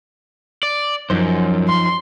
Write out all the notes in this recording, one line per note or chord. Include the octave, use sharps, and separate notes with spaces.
D5
F#2 F3 D#4 C5
C6